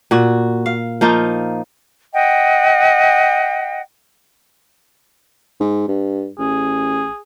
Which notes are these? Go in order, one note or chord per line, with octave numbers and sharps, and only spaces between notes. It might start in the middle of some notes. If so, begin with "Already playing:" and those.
A#2 F#4
F5
F3 A#3 D#4 F4
D#5 E5 F#5 G5
G#2
G2
A1 G#4